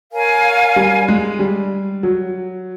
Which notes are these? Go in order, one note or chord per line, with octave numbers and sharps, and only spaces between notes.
A#4 C#5 F5 G#5
G3
G#3
G3
F#3